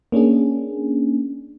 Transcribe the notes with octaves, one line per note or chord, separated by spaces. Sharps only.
A#3 C#4 D4 G#4